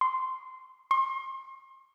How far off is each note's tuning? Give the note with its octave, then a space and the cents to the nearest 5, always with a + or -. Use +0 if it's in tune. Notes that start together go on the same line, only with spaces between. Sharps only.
C6 -10
C6 +35